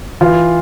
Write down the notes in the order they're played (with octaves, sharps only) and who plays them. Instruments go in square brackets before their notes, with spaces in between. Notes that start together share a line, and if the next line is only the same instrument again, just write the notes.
[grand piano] E3 F4